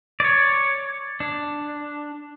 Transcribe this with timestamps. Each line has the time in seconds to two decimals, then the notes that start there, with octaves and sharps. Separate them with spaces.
0.20 C#5 D5
1.20 D4